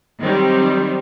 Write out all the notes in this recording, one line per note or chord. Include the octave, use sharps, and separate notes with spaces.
D#3 F#3 G3 C4